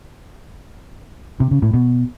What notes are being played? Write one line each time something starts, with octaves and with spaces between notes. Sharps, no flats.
C3
C#3
A2
B2